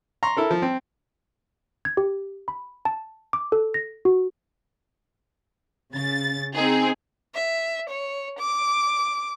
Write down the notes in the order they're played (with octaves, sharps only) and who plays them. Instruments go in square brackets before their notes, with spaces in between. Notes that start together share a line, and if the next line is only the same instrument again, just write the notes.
[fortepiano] A#5 C6 C#6
E4 A4 A#4
F3
C4
[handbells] G#6
G4
B5
A5
D6
A4
A#6
F#4
[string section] C#3 A6
C4 D#4 G#4
[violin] E5
C#5
D6